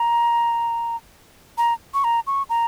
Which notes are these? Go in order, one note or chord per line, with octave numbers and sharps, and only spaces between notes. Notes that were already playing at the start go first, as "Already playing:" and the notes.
Already playing: A#5
A#5
C#6
A#5
C#6
A#5